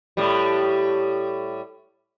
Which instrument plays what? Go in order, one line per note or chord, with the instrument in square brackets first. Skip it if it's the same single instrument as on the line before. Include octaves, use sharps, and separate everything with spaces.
[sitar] A2 G3